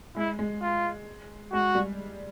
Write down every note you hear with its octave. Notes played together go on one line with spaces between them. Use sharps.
G#3 E4
G#3
F4
G#3 F#4
G3